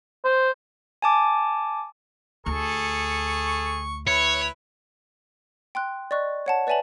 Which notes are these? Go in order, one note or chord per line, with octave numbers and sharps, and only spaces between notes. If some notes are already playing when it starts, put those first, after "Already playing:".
C5
G#5 A5 D6
D2 G#4 A4 C#6
E4 B4 C#5
G5 C6 F#6
D5 D#5 C#6 F#6
C#5 F#5 A5
B4 D5 E5 G#5 A5 F#7